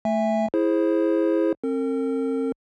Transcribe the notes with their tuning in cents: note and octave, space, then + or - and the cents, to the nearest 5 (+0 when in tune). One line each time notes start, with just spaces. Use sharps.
A3 +0 E5 +0 G#5 -25
E4 +0 G#4 +5 C5 +15
C4 +35 A#4 -40